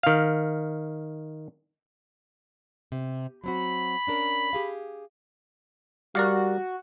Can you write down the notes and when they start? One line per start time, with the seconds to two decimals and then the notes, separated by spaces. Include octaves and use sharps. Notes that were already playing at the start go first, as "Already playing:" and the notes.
0.03 D#3 F5
2.92 C3
3.44 F#3 C4 F#4 B5
4.07 C#4 D4 A#4
4.53 G4 G#4 F5
6.15 G3 F#4 A#4 D5 F5